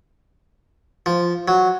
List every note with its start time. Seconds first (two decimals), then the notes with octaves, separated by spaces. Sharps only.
1.06 F3
1.48 F#3